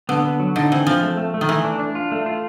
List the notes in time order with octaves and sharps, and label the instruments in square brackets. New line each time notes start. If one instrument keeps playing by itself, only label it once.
[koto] D3 [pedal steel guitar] B3
[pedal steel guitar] B3
F#3
[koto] D3 [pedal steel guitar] D#4
[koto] E3 [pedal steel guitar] C4
[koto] F3 [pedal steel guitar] C4
[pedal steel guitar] A3
A3
A3
[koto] D#3
[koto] E3 [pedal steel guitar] A3
[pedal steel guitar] D4
D4
F4
A3
F4